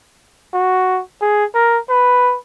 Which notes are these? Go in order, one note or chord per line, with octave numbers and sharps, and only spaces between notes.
F#4
G#4
A#4
B4